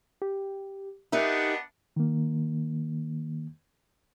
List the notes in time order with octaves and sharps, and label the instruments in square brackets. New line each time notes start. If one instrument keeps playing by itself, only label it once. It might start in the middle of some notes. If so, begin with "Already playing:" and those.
[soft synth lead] G4
[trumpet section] B3 D4 F#5 [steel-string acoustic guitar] D#4 G4 A#4 [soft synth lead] E5
[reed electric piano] D#3 A#3